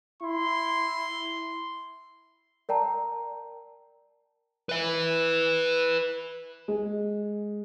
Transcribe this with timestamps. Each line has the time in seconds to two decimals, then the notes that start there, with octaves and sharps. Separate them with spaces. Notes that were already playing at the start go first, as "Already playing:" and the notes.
0.22 E4 C6
2.69 A#4 D5 G5 A5 A#5
4.69 B4 E5
6.68 G#3